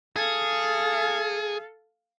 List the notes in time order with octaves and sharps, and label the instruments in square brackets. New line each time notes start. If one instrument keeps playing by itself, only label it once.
[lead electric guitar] G#4 [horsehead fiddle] A4 F5